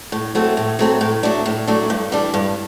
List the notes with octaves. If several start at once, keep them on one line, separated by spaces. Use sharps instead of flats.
A2
F#3 A3 C4
A2
F#3 A3 C4
A2
F#3 A3 D4
A2
F#3 A3 D4
G2
E3 G3 D4
G2